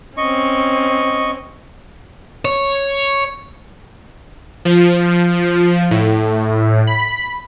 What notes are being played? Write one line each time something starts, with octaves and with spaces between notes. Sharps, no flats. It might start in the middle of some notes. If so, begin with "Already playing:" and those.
C4 C#4 D#5 C#6
C#5
F3
A2
B5